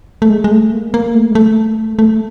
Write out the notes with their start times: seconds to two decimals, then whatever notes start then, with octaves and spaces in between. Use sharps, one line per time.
0.22 A3
0.30 G#3
0.44 G#3
0.52 A3
0.73 A#3
0.94 A#3
1.15 A3
1.31 G#3
1.35 A3
1.99 A3